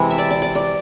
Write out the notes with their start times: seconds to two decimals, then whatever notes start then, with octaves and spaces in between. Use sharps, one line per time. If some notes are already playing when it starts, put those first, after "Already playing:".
Already playing: C3 E3 G#3
0.10 E5
0.18 D5
0.31 D5
0.42 D5
0.55 D5